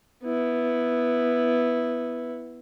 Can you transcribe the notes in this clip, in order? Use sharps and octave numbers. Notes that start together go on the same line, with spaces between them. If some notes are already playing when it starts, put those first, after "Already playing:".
B3 E4